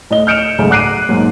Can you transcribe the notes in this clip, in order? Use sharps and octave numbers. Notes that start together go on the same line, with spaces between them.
A2 D#5 G7
F6 G6 C#7 D7 E7 F7
B1 G#2 C#3 A3
F#5 D6 F#6 C7 D7 D#7
B1 G#2 A#3